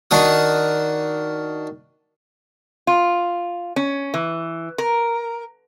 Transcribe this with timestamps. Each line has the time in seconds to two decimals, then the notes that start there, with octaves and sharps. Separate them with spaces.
0.11 D#3 D4 F#4 D#6
2.87 F4
3.76 C#4
4.14 E3
4.78 A#4